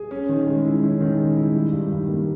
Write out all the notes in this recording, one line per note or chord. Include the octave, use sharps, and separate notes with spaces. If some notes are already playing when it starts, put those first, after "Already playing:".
Already playing: G#4
C#4
D#3
G#3
E4
C#4
D#3
G#3
E4
G3
G2
D#3
A#3